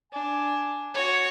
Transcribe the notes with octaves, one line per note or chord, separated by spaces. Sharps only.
D4 G#5
F#4 C#5